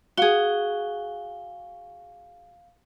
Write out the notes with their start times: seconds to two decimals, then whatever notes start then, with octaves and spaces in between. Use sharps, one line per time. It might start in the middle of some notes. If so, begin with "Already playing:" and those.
0.17 F#4 G#4 F5 G7